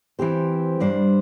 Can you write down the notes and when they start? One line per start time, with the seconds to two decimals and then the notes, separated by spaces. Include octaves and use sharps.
0.19 E3 C4 G4 C5
0.80 G2 G3 D4 C5